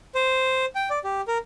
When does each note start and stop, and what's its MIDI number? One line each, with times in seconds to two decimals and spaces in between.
0.15 0.65 72
0.75 0.89 79
0.90 0.99 74
1.04 1.21 67
1.27 1.38 70